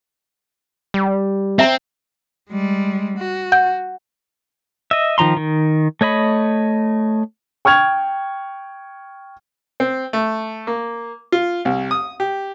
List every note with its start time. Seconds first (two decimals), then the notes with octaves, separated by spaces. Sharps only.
0.94 G3
1.59 C4 E5 A#5
2.50 G3 G#3
3.18 F#4
3.52 F#5 G6
4.91 D#5 E5
5.18 D#3 F3 A#5 C6
5.37 D#3
6.01 A3 C#5 D#5 B5
7.65 G5 C#6 F6 G#6 F7
9.80 C4
10.13 A3
10.67 A#3
11.32 F4
11.65 C2
11.91 D#6
12.20 G4